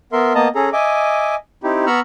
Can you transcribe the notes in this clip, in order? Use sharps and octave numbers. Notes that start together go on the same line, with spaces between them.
B3 A#4 E5 C6
A#3 B3 D#5 A5 A#5
C#4 G#4 A4 A#5
D#5 E5 G#5 D6
C4 D#4 E4 G4
B3 A#5 B5 C#6 E6 F6